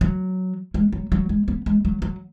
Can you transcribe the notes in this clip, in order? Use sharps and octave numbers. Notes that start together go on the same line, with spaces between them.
F#3
G#3
F#3
F#3
G#3
B3
G#3
F#3
F#3